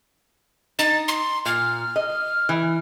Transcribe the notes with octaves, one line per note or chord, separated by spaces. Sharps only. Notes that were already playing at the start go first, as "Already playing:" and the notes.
D#4 A6
C6
A#2 F6
D#5
E3